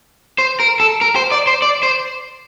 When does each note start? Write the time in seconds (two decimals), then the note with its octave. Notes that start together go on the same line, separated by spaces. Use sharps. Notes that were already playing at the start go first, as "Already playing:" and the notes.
0.38 C5
0.60 A#4
0.80 A4
1.01 A#4
1.16 C5
1.32 D5
1.47 C5
1.62 D5
1.83 C5